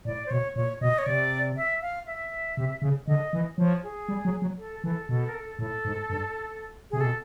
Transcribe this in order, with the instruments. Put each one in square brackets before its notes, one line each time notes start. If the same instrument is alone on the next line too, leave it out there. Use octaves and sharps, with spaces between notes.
[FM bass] A2 [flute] D5
[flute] C5
[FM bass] B2 [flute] C#5
[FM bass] A#2 [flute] C#5
[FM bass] B2 [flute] D#5
[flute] C#5
[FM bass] C3 [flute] D5
[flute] E5
F5
E5
[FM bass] C3
C#3
[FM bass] D3 [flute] D#5
[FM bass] E3
[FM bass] F3 [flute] C#5
[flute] G#4
[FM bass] G3
F#3
F#3
[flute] A4
[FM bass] E3 [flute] A4
[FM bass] B2 [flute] A4
[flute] A#4
A4
[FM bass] A2 [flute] A4
[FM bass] G#2
G2
[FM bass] C3 [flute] G#4
[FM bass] B2 [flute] A4